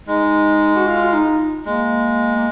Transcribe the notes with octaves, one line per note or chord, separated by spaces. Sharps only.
G#3 D#4
F#4
F4
D#4
G#3 A#3
A#3